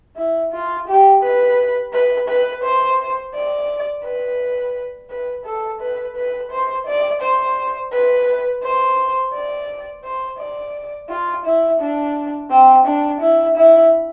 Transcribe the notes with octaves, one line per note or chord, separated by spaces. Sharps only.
E4
F4
G4
B4
B4
B4
C5
D5
B4
B4
A4
B4
B4
C5
D5
C5
B4
C5
D5
C5
D5
F4
E4
D4
C4
D4
E4
E4